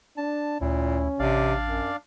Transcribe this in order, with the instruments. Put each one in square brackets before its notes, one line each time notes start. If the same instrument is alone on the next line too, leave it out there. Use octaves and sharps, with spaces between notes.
[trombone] D4 [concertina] A5
[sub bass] D2 [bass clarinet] A#2 [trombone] C#4 [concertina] E4
[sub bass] A1 [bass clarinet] C3 [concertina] D4 D5 F5
[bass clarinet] F#2